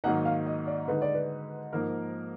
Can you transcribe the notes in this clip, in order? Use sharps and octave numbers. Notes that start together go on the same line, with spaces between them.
G#2 D#3 F#3 A#3 D#4 F#5
F5
D#5
D5
D3 G#3 D#4 B4
D5
B4
G#2 F3 A#3 D#4 A#4